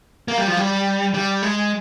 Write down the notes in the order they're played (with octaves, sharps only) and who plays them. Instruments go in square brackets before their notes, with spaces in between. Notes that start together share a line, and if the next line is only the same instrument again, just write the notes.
[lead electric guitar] A#3
G3
F3
G3
G3
G#3